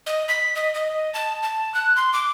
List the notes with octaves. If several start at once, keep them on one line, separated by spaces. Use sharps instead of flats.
D#5
B6
D#5
D#5
A5
A5
F#6
C6
D6